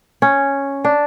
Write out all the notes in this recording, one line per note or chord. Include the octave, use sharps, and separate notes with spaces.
C#4
D4